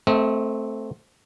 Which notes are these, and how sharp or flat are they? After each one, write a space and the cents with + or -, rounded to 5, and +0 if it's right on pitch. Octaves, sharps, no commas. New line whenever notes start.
A3 +0 C4 +0 D#5 +45